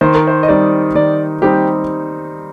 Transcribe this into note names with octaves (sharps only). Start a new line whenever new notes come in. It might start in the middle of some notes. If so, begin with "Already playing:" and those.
D#3 C5
A#4
C5
D#5
G3 C4 D#4 D5
D#3 D5
G3 C4 D#4 G4